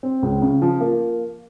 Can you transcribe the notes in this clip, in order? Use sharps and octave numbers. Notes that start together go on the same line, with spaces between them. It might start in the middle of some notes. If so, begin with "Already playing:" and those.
C4
C#2
C#3
F3
A#3